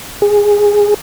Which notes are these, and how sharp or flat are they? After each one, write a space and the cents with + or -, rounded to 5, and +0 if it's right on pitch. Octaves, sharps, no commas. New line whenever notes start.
G#4 -10